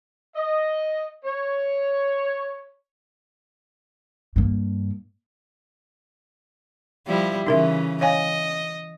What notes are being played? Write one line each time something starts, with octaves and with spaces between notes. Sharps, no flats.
D#5
C#5
G2 A#3
F3 G3 E4
C#3 E3 D#4 A#4 E5
C#5 D#5 F5 G#5